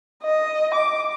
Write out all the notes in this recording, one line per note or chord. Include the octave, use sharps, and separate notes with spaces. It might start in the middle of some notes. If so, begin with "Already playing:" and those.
D#5
D6